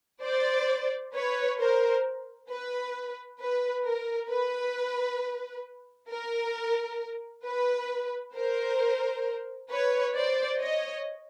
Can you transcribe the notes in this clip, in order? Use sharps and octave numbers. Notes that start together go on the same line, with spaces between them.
C5 D5
B4 C#5
A#4 C5
B4
B4
A#4
B4
A#4
B4
A#4 C5
B4 C#5
C5 D5
C#5 D#5